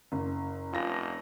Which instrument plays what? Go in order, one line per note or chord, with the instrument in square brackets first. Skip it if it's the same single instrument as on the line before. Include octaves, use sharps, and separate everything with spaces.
[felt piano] F#1
[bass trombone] F1 [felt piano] F4 A#6